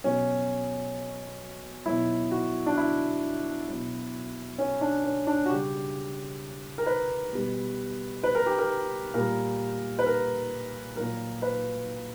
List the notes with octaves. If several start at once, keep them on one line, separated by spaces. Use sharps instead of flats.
B2 F#3 C#4
B2 F#3 E4
F#4
D4
E4
B2 F#3
C#4
D4
C#4
D4
F#4
C#3 G3 G4
A#4
B4
B2 G3
B4
A#4
G4
A#4
A#2 G3 A#4
B4
A#4
A#2 F#3 A#4
B4